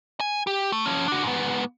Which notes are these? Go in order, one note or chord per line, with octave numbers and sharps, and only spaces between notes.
G#5
G4
A3
F3 C#4
D4 F#4
G#2 B3